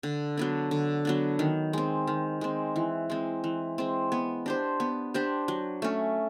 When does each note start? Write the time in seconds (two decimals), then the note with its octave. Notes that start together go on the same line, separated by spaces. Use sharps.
0.03 D3
0.37 F#3 B3 D4
0.71 D3
1.05 F#3 B3 D4
1.39 D#3
1.73 G#3 C4
2.07 D#3
2.41 G#3 C4
2.76 E3
3.10 G#3 C4
3.44 E3
3.78 G#3 C4
4.12 B3
4.46 D4 G4 C5
4.80 B3
5.14 D4 G4 C5
5.48 F#3
5.82 A3 C#4